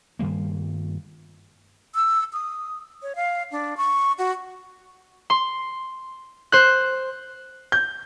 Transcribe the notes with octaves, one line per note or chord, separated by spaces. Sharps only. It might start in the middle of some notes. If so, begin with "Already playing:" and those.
G2 D#3 G3 A#3
E6
D#6
C#5
F5
D4
C#6
F#4
C6
C5 F#6
G6